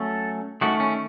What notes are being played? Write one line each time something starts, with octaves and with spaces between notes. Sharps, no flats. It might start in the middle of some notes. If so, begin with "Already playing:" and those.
Already playing: F#3 A3 C#4 A4
D#3 A3 C#4 F#4
C#4